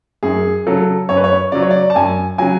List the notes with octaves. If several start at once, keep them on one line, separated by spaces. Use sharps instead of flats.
F#2 G#4
C#3 F#3 A4
F#2 C#5
B4
C#5
C#3 F#3 D5
C#5
D5
A5
F#2 G#5
C#3 F#3 G#5